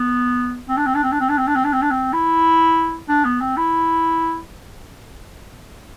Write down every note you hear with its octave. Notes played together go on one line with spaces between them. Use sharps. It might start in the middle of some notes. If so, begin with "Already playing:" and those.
Already playing: B3
C4
D4
C4
D4
C4
D4
C4
D4
C4
D4
C4
D4
C4
D4
C4
E4
D4
B3
C4
E4